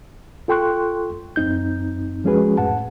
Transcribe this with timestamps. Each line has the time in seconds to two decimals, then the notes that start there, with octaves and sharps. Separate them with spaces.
0.48 F4 A4 G5 C6 C#6 F#6
1.36 F#2 C4 D#4 G6
2.24 F3 G#3 C#4 F#4 G#4 B4
2.58 F2 A2 F#5 A5